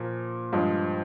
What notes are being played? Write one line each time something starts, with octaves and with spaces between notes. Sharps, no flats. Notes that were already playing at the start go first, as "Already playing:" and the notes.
Already playing: A#2 F3 A#3
G2 F3 G#3